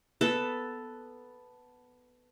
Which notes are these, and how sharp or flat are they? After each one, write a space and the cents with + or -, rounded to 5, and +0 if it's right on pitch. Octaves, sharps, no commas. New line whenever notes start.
B3 +5 A4 +0